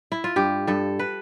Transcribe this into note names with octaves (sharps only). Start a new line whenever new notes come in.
E4
F4
G2 G4
G2 A4
B4